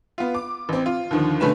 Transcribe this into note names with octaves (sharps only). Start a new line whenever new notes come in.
B3 F4
D6
A1 C4
F4
D#2 D3 D#3 F3
B2 D3 A3 C#4 B4 E7